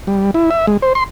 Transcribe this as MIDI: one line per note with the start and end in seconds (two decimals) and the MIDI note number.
0.07 0.31 55
0.34 0.50 64
0.50 0.66 76
0.67 0.77 56
0.82 0.93 72
0.95 1.04 84